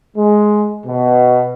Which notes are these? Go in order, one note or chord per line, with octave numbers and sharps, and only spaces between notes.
G#3
B2